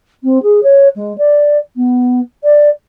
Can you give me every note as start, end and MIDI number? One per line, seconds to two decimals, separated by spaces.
0.23 0.41 60
0.42 0.60 68
0.63 0.88 73
0.96 1.16 56
1.18 1.57 74
1.76 2.20 59
2.43 2.69 74